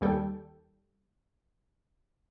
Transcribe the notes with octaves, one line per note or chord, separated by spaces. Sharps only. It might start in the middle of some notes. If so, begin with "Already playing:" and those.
D#2 D#3 G3 A4 G5